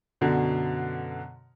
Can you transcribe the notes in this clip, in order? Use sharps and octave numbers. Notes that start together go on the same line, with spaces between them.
F#2 B2 D3